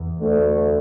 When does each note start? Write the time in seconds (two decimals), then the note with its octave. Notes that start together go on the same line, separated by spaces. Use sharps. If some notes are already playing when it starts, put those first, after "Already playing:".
Already playing: E2
0.19 D2 D3 A3